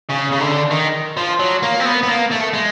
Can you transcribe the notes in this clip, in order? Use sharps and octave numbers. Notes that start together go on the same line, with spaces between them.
C#3
C#3
D3
D#3
F3
F#3
A#3
C4
B3
B3
A#3
A3
G#3